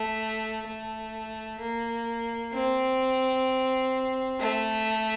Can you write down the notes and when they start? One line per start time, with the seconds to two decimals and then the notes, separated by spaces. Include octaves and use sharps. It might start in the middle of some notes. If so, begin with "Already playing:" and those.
Already playing: A3
0.67 A3
1.61 A#3
2.53 C4
4.40 A3